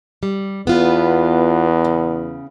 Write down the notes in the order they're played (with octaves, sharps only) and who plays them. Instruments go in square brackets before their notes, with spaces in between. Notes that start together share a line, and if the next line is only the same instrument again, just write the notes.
[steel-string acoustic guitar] G3
[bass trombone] E2 [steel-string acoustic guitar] B3 F4 B4
[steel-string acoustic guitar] C#3